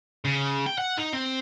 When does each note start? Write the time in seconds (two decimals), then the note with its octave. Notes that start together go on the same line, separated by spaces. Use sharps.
0.25 C#3
0.66 G5
0.78 F#5
0.98 D#4
1.13 C4